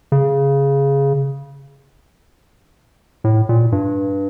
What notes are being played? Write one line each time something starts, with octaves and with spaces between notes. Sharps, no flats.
C#3
A2
A#2
G2